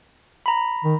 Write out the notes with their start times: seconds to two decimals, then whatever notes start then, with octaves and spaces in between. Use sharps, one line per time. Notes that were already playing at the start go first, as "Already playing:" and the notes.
0.46 A#5 B5
0.84 D#3